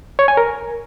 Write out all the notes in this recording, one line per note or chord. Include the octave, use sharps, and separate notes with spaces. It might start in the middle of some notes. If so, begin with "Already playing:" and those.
C#5
G#5
A#4